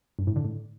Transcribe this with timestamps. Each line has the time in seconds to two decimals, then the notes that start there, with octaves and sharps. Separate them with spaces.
0.19 G2
0.27 A2
0.36 D3
0.45 A2